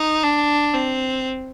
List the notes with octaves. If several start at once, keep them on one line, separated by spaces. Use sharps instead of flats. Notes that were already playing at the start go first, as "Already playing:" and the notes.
Already playing: D#4
D4
C4